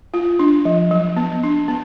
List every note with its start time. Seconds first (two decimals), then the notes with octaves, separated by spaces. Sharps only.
0.14 F4
0.39 D4
0.65 F3
0.91 F#3
1.17 B3
1.43 D4
1.68 B3